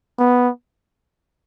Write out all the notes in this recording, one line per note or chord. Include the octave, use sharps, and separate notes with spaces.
B3